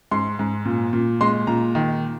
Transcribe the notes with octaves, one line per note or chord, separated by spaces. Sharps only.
G#2 C6
G#2
A#2
A#2
G#3 C6
A#2 A#5
D#3